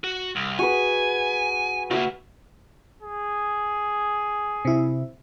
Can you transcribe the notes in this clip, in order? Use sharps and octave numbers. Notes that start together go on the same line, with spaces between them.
F#4
C2
F#4 G#4 B4 G#5
C#3 A#3 F#4 E5 C#6
G#4
C3 E4